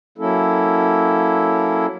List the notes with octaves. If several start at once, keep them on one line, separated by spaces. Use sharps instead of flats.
F#3 A#3 C#4 E4 A4